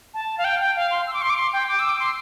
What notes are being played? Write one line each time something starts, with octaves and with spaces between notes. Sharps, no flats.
A5
F5
G5
G5
F5
C6
E6
D6
C6
D6
C6
G5
D6
E6
D6
C6